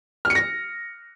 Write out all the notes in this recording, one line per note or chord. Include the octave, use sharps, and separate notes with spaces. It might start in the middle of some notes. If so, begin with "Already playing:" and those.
F6
C#7
A#6